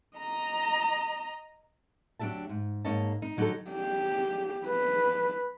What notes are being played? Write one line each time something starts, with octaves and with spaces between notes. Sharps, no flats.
D#5 A#5
D2 F#3 D4 G4 E5 A5
G#2
G#2 A#3 C#5 D#5 A5
D#4
D3 F#3 D#4 F4 G4 A4
G4
B4